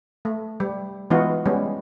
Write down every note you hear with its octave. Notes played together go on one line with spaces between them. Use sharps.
A3
G3
E3 G#3 B3 D#4 F4 F#4
G3 G#3 B3 C#4